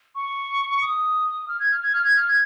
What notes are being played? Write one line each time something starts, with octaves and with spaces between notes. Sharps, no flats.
C#6
D#6
F6
G#6
F6
G#6
F6
G#6
F6
G#6